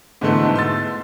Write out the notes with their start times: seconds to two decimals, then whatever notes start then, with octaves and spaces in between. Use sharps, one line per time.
0.21 G#2 B2 D3 E3 A3
0.55 C6 E6 A6